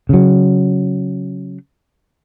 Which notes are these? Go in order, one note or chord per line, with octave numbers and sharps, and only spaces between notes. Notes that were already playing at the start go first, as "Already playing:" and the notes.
C#3 F#3